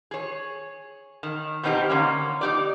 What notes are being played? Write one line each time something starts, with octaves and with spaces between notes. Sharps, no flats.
G#4 C#5
D#3
B2 D#3 C4 D#4 G4
D3 A#3 C#4
D#4 G4 D5